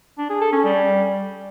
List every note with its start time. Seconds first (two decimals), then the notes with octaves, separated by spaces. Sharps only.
0.18 D4
0.30 G#4
0.41 A4
0.53 C#4
0.64 G3